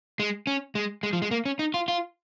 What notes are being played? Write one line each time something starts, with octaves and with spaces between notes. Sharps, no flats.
G#3
C#4
G#3
G#3
F3
G#3
A#3
C#4
D#4
F4
F4